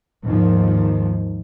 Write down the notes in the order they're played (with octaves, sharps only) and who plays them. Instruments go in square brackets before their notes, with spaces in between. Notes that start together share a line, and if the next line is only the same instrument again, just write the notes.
[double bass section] D#2 G#2 D#3 F3